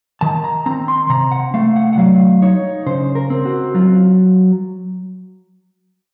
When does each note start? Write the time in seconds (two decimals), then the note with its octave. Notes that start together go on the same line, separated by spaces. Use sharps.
0.21 D#3 A5
0.44 A#5
0.66 C4 A#5
0.88 C6
1.10 C3 A#5
1.31 F#5
1.54 A3 F5
1.76 F#5
1.93 F#5
1.98 F#3 F5
2.42 D#4 C#5
2.86 C#3 C5
3.15 A#4
3.30 C4
3.45 F#4
3.74 F#3 F4